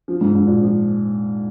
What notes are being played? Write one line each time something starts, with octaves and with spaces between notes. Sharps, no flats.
F3
G#2
G#2
A#2
F3